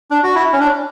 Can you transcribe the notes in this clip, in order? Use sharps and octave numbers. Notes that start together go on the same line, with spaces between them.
D4
F#4
E4
C#4
D4